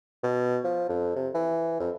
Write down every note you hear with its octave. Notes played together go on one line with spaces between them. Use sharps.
B2
F3
F2
C3
E3
F2